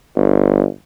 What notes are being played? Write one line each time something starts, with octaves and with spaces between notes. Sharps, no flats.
G1